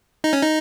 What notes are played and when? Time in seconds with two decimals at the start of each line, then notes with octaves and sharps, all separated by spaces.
0.24 D#4
0.33 C#4
0.43 D#4